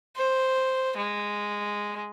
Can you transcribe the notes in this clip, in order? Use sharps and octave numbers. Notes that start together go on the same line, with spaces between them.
C5
G#3